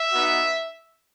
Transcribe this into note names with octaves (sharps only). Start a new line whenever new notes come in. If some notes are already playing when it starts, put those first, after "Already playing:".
Already playing: E5
B3 D#4 F#4